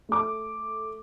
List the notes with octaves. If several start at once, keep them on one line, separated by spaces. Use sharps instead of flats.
A3 A4 D6